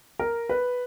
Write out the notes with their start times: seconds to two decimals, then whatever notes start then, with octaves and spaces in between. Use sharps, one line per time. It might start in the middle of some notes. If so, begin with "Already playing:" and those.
0.19 A#4
0.49 B4